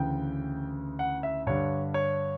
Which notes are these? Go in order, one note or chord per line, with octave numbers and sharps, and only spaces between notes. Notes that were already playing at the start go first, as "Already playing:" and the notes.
Already playing: D2 C#3 E3 G5
F#5
E5
G2 D3 C#5
C#5